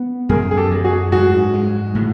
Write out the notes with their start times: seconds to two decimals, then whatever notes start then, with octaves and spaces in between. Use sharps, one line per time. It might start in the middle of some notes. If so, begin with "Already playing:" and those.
Already playing: B3
0.29 F#2 G#4 A#4
0.51 G#4
0.57 G4 A4
0.71 F#3
0.84 F#4 G#4
1.12 G#2 F#4 G#4
1.54 G#3
1.95 A2